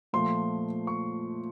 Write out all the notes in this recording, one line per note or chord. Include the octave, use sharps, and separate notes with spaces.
A#2 F3 A3 C6
C#6